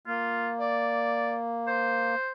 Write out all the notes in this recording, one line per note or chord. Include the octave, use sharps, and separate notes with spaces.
A#3 F4
D5
C5